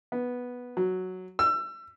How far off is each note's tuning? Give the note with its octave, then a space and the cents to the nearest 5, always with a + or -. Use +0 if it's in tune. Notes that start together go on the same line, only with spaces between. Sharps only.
B3 -5
F#3 +0
E6 +30